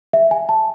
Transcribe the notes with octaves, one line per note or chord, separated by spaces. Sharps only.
E5
G#5
A5